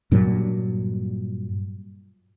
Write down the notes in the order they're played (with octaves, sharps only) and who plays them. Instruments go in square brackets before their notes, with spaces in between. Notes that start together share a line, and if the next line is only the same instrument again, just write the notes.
[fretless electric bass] G2 A#2 F#3